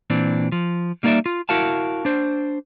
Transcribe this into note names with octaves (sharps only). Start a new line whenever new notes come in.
A#2 E3 C4 D4
F3
G3 A#3 D#4 C#5 D5 E5
F4
E4 F#4 A#4 F5 A5
D4 C5